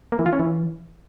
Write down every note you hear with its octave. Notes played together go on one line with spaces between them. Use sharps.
A#3
E3
F4
C#4
E3